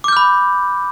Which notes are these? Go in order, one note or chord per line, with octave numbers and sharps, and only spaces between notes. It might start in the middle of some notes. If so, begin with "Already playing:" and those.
B5 D6 F6 G6